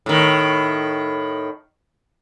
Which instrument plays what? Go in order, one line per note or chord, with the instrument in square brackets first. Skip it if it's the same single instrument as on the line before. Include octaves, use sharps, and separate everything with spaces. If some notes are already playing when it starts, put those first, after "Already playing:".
[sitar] A2 D#3